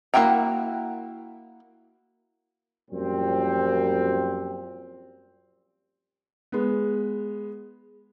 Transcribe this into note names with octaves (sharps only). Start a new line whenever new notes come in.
A#3 E4 F#4 G5 A#5
F#2 A#2 F3 G3 C4
G#3 B3